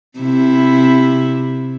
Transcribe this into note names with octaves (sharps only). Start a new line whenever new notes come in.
C3 E4